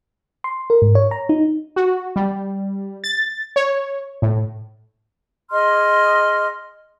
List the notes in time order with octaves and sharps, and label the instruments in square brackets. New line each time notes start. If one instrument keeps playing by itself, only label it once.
[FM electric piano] C6
A#4
G#2
C#5
A#5
D#4
[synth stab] F#4
G3
A6
C#5
A2
[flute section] G#4 D#5 C6 F6